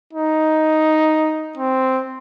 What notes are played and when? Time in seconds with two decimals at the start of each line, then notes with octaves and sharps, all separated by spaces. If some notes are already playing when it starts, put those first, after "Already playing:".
0.13 D#4
1.58 C4